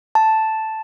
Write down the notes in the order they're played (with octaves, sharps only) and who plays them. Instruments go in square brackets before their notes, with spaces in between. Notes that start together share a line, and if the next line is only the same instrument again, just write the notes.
[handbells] A5